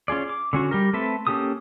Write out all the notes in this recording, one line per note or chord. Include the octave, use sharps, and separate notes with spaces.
C#4 F4 G#4 D5
D6
D3 C#4 F#4
G3 G4 A#4
A3 C4 A4 B4 E5
A#3 C#4 G4 A4 D#6